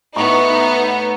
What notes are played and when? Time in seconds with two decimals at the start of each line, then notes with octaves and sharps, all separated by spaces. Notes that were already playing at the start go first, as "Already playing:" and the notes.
0.16 A2 B3 D#4 A#5 C#6